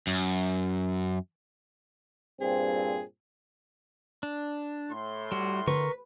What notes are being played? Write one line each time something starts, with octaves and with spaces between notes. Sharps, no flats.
F#2
G2 A#2 C4 G#4
D4
A2 C6
G3 F#4
D3 A#4 B4 C#6